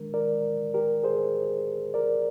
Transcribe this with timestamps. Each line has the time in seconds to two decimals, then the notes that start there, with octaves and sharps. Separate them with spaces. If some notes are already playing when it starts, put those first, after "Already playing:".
Already playing: D#3 G#3 D4 A#4
0.14 A#4 D5
0.74 G4 A#4
1.04 G#4 C5
1.94 A#4 D5